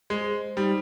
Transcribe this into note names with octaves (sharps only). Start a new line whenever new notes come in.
G#3 C5
G3 D#4